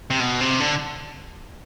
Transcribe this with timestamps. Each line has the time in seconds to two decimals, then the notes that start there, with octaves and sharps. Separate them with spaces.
0.10 C3
0.20 B2
0.41 C3
0.60 D3